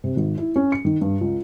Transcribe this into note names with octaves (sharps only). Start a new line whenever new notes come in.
C3
G#1
E4
C#4
C#7
D#3
G2
C#2